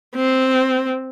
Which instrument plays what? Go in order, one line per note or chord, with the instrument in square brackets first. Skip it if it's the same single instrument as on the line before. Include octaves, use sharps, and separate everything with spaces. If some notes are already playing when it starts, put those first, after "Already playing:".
[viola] C4